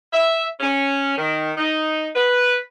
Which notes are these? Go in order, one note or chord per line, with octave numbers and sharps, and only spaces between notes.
E5
C#4
D#3
D#4
B4